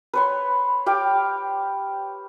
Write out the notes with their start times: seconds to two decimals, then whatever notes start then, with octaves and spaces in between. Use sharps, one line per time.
0.13 B4 C#5 C6
0.86 G4 F5 G5